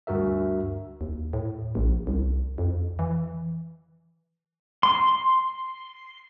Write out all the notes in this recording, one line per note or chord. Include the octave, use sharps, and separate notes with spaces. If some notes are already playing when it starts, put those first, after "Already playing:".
D2 G2 F#4 A#4 E5
D#2
A2
A#1
C2
F2
E3
C6